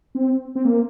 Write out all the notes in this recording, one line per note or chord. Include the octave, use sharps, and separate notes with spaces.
C4
C4
A#3